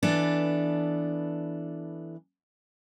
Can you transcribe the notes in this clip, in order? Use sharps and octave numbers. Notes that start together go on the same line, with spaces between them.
E3 B3 D4 A4